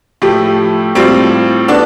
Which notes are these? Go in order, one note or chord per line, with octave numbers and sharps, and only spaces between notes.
A2 F3 A3 E4 G4
A2 G3 C4 F4
B3 D4 A4 D5